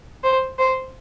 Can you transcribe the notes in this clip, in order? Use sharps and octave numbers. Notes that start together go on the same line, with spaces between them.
C5
C5